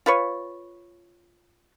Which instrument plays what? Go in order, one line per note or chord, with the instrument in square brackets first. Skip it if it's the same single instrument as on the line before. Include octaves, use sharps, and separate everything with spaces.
[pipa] F4 B4 C#5